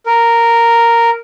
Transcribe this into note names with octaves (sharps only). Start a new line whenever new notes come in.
A#4